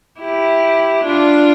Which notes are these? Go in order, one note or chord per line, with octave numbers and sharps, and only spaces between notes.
E4 G4
D4 F4